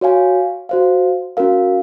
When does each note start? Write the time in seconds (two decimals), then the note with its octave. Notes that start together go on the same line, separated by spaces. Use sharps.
0.01 F#4 C#5 F5 G#5
0.69 F#4 C5 F5
1.37 C#4 F#4 A#4 F5